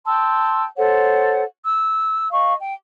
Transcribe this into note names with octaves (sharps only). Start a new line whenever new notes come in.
G5 A5 C6 E6
A4 C5 C#5 F#5
E6
D#5 F5 C#6
G5